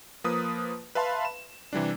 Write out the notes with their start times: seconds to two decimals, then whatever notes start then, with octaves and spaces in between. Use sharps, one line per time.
0.24 F3 A#3 B4 D#6
0.95 B4 E5 F5 A5 B5 C6
1.25 E7
1.73 C3 E3 G3 D4